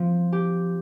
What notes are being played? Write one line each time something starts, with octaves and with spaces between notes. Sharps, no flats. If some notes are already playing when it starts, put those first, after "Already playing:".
Already playing: F3 C4
G4